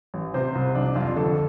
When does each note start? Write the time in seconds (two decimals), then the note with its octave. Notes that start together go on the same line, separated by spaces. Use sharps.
0.14 A1
0.34 C3 C5
0.55 C2
0.75 F2 D4
0.86 D4
0.95 F2 F4
1.06 D4
1.16 D2 A4